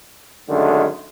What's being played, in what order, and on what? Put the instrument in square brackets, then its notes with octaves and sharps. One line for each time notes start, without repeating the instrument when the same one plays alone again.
[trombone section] F#2 D3 D#3 G#3 A3